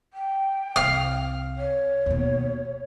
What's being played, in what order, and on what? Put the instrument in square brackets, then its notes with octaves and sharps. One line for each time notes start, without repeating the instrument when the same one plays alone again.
[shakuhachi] G5
[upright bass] C2 C4 [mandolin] F5 F6
[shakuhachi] C#5
[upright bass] D#2 B2